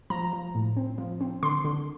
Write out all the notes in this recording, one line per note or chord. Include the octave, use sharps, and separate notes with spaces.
F3 A#5
F3
A2
C4
F3
C4
D3 C6
D3